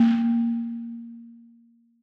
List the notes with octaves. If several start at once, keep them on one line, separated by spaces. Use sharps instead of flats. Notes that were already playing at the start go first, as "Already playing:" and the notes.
Already playing: A#3